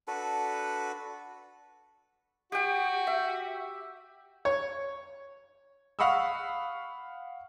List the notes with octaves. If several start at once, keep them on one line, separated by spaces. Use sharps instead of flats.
D4 F#4 A4 B4
F#4 G4 G5
E5
C#5
F5 F#5 B5 C#6 D#6 E6